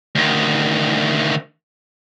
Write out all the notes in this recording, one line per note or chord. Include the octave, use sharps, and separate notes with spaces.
D2 D#3